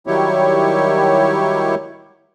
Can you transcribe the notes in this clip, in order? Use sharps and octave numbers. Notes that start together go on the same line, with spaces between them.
D#3 F#3 G3 E4 G4 C#5